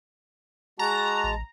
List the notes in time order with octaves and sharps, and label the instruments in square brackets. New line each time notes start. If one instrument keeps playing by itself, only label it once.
[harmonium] G#3 A5 [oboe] F#4 [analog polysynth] A#5
[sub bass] A1